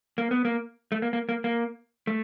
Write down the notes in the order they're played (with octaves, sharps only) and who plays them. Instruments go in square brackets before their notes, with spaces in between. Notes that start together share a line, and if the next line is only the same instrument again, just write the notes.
[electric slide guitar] A#3
B3
A#3
A3
A#3
A#3
A#3
A#3
A3